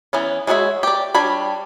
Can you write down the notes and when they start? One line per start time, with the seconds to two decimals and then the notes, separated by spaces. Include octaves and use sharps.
0.13 E3 B3 C#4
0.47 G#3 F#4 G#4 C#5 E5
0.83 G4 D5
1.14 G3 D4 C#5 B5